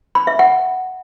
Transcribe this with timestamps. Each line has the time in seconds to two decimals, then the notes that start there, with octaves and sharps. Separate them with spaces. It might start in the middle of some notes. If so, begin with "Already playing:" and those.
0.15 B5
0.27 E5
0.39 F#5